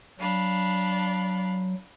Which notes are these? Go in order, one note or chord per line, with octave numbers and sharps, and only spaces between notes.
F#3 D4 F5 B5